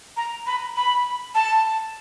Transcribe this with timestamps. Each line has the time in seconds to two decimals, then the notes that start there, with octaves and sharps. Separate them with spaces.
0.17 A#5
0.47 B5
0.76 B5
1.35 A5